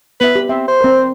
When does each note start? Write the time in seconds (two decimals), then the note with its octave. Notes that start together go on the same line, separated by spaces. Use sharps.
0.21 B3 B4 E5
0.35 G4
0.49 C4 E5
0.68 C5
0.81 C4 A#4